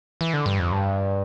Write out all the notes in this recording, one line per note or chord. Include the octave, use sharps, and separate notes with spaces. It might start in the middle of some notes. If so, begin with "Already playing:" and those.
E3
D3
G2
F2
G2